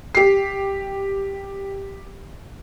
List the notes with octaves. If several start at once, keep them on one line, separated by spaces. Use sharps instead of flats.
G4 C7